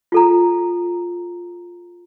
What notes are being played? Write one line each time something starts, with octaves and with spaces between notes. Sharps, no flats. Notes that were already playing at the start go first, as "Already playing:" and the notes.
F4 A4 A#5